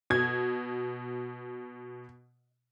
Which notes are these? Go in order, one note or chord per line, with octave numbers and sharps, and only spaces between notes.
B2 G#6